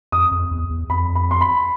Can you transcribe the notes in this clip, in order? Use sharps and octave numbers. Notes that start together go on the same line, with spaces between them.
F2 D#6
F2
E2
E2
F2 B5
B5
C6
B5